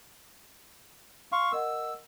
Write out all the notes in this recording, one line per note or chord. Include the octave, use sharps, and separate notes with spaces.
F5 C6 C#6
A#4 D#5 F#5 E6